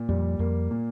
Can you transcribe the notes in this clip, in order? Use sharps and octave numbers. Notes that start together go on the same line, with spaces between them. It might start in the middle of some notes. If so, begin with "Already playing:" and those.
Already playing: A#2
F2 G3
F2 A#3
A#2